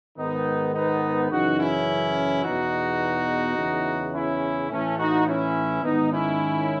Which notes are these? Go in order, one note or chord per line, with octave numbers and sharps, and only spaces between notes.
G#2 D#3 B3 D#4
B3 D#4
F#2 C#3 E3 D#4 F#4
C#4 E4
E2 B2 D#4 F#4
E2 C#3 E3
C#4 E4
A2 E3 A3 C#4
D#4 F#4
C#4 E4
G#2 D#3 B3 D#4
C#4 E4